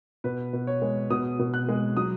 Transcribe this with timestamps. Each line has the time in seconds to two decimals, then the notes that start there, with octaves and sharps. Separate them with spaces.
0.24 B2 B4
0.53 B2
0.67 C#5
0.82 G#3
1.10 B2 D#6
1.39 B2
1.54 F#6
1.68 G#3
1.97 F#3 D#6